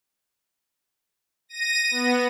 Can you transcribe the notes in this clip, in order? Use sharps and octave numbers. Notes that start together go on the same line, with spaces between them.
A#6 D#7
B3